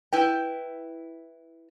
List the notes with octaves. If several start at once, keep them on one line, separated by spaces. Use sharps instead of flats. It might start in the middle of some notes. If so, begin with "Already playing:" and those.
E4 B4 G5